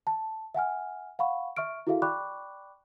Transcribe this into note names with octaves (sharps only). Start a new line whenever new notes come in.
A5
E5 F#5 G#5 F6
F5 F#5 B5 C#6
E5 C#6 F6 D7
E4 F#4 G#4 A4 E5 F5
D5 G5 B5 C#6 D6 F#6